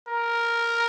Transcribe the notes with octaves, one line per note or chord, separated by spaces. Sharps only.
A#4